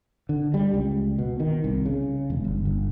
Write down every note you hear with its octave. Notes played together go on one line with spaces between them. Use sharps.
D3
G3
C#2
B2
D#3
C2
C#3
E1
G1
G1